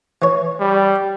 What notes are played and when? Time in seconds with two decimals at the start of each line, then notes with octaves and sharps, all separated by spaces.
0.22 E3 C#5
0.60 G3